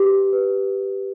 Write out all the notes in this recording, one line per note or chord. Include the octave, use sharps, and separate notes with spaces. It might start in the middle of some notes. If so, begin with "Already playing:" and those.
Already playing: G4 B4
B4